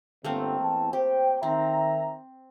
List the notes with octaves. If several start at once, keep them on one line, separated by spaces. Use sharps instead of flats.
G1 D3 A3 A#3 C4
E2 A5
G4 C5 G5
D#3 C4 E5 A#5